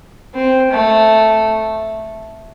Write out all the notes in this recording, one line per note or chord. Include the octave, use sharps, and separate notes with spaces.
C4
A3